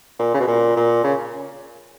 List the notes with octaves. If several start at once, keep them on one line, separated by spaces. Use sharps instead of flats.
A#2
C#3
B2
A#2
A#2
C#3